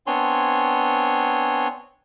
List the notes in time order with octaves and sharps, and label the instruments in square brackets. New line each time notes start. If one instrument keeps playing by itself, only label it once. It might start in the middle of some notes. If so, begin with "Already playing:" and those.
[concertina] B3 C4 D4 C#5 G#5 C6